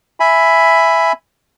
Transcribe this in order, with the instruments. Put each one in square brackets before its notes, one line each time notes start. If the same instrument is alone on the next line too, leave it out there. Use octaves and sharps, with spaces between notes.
[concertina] E5 G#5 B5